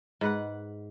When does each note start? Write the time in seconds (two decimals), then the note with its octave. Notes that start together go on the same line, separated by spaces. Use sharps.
0.21 G#2 B4 F#5